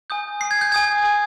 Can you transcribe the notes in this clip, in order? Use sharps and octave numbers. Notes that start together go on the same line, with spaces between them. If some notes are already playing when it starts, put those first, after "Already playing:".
G#5 D#6 G6
G#5 D#6 G6 C7
G#6
G6
G#5 D#6 G6 G#6
G#5 D#6 G6